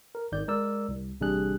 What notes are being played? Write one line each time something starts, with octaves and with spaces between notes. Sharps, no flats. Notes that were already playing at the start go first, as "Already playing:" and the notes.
A#4
G#1 D#3 D5 G6
G#3 A#4 D5 E6
C2
A1 C3 G3 D4 G#4 F#6